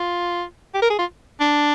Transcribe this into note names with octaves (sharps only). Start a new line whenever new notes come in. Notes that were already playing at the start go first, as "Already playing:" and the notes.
Already playing: F4
G4
A#4
G#4
F4
D4